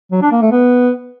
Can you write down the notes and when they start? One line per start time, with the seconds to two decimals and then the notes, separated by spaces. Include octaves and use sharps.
0.12 F#3
0.22 D4
0.32 A#3
0.41 A3
0.51 B3